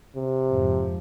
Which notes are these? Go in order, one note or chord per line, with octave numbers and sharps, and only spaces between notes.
C3
F2 G#2 F3